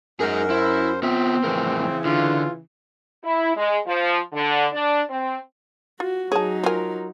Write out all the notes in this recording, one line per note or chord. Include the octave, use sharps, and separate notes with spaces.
F#2 D#4 G#4 A#4
E4 C5
B3 C4 F4 E5
F2 A2 C#3 E3 A#4
D3 F4
E4
G#3
F3
D3
D4
C4
F4 F#4
F#3 D#4 G#4 C#5 A5
F3 F4 A#4 G#5